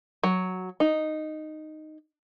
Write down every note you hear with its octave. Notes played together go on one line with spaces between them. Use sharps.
F#3
D#4